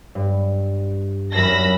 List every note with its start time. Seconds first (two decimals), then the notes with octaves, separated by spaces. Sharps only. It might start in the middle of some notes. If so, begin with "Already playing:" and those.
0.15 G2
1.33 D#1 F#2 B5 E6 A#6 C7